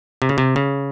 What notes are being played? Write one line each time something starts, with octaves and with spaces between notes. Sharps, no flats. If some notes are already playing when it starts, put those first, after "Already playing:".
C3
C#3
C3
C#3